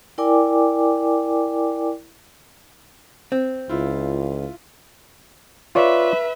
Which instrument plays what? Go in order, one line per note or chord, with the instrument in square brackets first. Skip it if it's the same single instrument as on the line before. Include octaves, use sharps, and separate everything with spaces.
[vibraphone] E4 A#4 D5 G5 G#5 D6
[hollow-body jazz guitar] C4
[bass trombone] C#2 [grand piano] E4 F4
[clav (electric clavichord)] F4 C#5 D5 [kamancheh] B4 E5